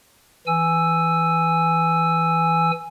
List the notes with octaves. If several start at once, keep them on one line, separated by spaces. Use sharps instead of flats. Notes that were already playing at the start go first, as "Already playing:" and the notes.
E3 G#5 E6